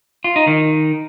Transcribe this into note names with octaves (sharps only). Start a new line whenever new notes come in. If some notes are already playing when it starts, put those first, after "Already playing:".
F4
D#4
D#3